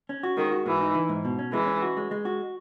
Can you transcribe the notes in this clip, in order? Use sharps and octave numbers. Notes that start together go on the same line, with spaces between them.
C#4
F#4
D#3 G#3
F#4
G#2 E3
D#4
E3
G#2
B2
C#4
E3 G#3
C#4
F#4
G#3
G#3
F#4